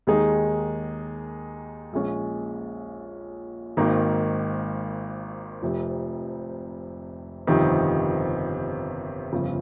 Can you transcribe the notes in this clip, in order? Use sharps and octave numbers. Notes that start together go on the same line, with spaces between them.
D#2 D#3 G#3 D#4 G#4
A#1 A#2 G#3 C#4
G#1 G#2 D#3 A#3
F1 F2 C3
G1 F2 C3 D#3
G1 F2 C#3